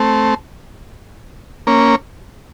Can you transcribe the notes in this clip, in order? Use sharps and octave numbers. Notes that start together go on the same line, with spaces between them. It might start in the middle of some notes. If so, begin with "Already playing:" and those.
Already playing: A3 C4
A#3 C#4